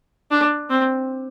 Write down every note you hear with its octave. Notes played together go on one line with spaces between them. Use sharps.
D4
C4